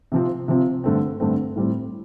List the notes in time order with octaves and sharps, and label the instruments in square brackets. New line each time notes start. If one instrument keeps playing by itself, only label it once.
[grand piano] C3 F3 C4
C3 F3 C4
G2 D3 A3 C4
G2 D3 A3 C4
A2 G3 C4